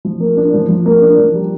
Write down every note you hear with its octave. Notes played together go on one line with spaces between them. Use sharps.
F3
A#3
D4
F3
F3
A#3
D4
F3
G3